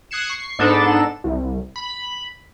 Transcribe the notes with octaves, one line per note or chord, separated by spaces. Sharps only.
D#6 F#6 G#6 C7 C#7 E7
C#6 C7
G#2 B3 D4 D#4 A4 E7
C2
B5